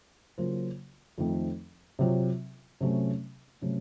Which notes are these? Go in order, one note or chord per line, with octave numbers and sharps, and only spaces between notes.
C#3 F#3 A#3 F4 C5
F2 D#3 A3 C4
C3 F#3 C4 F4
C3 F#3 A3 C#4
C3 F#3 A3 C#4